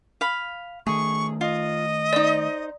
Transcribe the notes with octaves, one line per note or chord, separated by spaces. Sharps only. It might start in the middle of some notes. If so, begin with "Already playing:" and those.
F5 B5
D#3 A3 G#4 C#6
F4 D#5
D#4 C5 D5 D#6